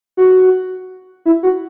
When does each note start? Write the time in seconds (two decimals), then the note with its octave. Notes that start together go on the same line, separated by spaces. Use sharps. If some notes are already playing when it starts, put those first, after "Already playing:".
0.17 F#4
1.26 E4
1.43 F#4